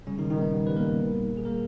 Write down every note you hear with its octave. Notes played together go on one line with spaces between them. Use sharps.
C#3 G3 C#4
D#3 D#4
A#2
D#3 D#4
G3 B3
G3
G3 B4
A#3 A#4
G3
A#2
A#2
G3
G#4
G3 A#3 A#4